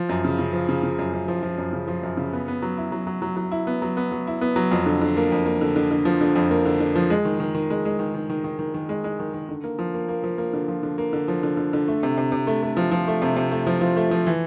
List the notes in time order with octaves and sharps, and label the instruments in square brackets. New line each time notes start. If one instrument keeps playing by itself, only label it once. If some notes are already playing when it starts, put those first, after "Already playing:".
Already playing: [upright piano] F3
F#2
C#3
C#3
F3
C#3
C#3
F#2
F#2
F3
F3
F#2
C#3
F3
F#2
C#3
B3
B3
F#3
E4
F#3
F#3
F#3
F#3
E4
B3
F#3
B3
F#3
E4
B3
F#3
F2
D3
D3
A#3
F2
A#3
D3
D3
D3
F3
D3
F2
A#3
D3
D3
F3
G#3
D#3
D#3
D#3
G#3
G#3
D#3
D#3
D#3
D#3
D#3
D#3
G#3
G#3
D#3
D#3
D3
A#3
F3
A#3
A#3
F3
A#3
D3
F3
D3
A#3
D3
F3
D3
D3
D3
A3
C3
C3
C3
A3
A3
F3
F3
A3
C3
C3
A3
F3
F3
A3
F3
E3